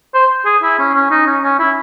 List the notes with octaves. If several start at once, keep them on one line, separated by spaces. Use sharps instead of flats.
C5
G#4
E4
C#4
C#4
D#4
C#4
C#4
E4